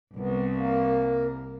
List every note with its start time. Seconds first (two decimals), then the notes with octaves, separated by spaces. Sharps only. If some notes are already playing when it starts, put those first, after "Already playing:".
0.16 C2 B3
0.56 A#3